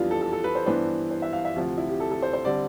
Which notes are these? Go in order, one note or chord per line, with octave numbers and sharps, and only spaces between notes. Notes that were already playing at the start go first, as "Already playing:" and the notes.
Already playing: F2 E3 G3 B3 D4 F4
A4
A4
A4
B4
C5
G2 E3 B3 D4 C5
C5
E5
F5
E5
D2 C3 F3 F4
E4
G4
A4
A4
C5
C5
D3 G3 C4 D5